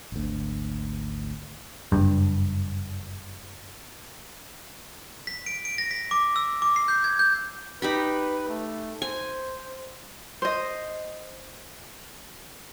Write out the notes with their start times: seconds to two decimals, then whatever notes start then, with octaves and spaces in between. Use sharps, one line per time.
0.12 G#1 D2
1.92 F#1 G2
5.27 B6
5.46 D7
5.65 D7
5.78 A#6
5.91 B6
6.11 D6
6.36 E6
6.62 D6
6.76 C7
6.88 G6
7.04 G#6
7.19 G6
7.82 D#4 G4 B4 B5
8.49 A3
9.02 C5 G#5
10.42 C5 D#5